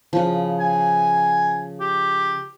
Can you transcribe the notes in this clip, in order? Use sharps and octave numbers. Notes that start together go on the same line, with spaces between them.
C#3 F3
G#5
G4